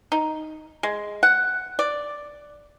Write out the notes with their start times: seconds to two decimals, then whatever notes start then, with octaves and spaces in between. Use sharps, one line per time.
0.12 D#4
0.83 G#3
1.23 F#5
1.79 D5